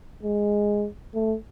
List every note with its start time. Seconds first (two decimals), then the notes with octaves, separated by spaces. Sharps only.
0.23 G#3
1.14 A3